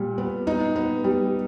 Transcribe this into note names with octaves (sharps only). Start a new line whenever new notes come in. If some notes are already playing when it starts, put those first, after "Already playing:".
Already playing: A#2 G3
B3
D#4
B3
G3